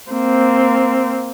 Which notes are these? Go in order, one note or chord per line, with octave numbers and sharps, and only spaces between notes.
A#3 C4